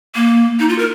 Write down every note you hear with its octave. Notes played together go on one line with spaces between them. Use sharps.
A#3
D#4
F4
A#4